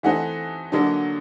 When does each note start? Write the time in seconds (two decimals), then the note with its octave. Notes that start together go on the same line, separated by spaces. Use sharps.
0.03 E3 A3 C4 D#4 F#5
0.72 D3 F#3 A#3 D#4